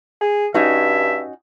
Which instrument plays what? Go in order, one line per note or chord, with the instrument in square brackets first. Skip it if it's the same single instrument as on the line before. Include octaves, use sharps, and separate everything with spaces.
[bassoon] G#4
[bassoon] G2 [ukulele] C#4 D#4 F#4 [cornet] E5